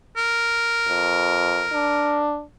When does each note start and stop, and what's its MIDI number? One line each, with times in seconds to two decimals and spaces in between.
0.17 2.25 70
0.88 1.66 41
1.73 2.43 62